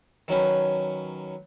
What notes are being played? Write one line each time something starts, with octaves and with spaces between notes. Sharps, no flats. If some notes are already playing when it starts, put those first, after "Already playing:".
D#3 F#3 C#4 B4